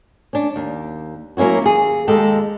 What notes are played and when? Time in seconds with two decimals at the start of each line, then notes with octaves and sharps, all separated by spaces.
0.33 C#4 D4
0.56 D#2
1.37 F#3 A#3 C#4 E4 F#4
1.62 D#2 G#4
2.08 D#2 G#3 G4 A4